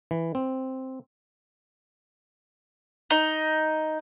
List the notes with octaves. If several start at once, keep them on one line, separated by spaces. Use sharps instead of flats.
E3
C4
D#4